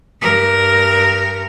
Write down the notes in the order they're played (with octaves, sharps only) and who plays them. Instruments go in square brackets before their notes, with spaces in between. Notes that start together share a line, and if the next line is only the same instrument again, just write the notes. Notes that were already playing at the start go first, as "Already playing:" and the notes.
[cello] G2 A#4